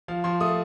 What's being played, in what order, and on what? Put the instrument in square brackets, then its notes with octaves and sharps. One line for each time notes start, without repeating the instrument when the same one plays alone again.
[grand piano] F3 F5
F3 C6
A3 D#6